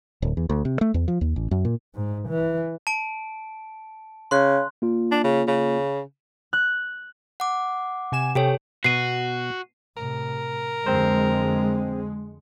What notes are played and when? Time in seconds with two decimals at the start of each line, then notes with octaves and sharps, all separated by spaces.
0.22 D1
0.37 E2
0.50 D2
0.65 C3
0.81 A3
0.94 E2
1.08 F3
1.21 D#2
1.36 A1
1.51 F#2
1.65 A#2
1.95 G#2
2.29 E3
2.87 A5 D7
4.31 C#3 C6 F#6
4.82 A#3 F4
5.11 D4
5.24 C#3
5.48 C#3
6.53 F#6
7.40 F#5 D6
8.12 C3 G#5 E7
8.35 C3 G4 A4 C#5 G5
8.84 B2 F#4 C7 D#7
9.97 A2 C3 A#4
10.86 F2 D3 G#3 C4 C5